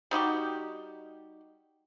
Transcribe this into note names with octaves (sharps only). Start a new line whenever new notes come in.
G3 D#4 F#4 G4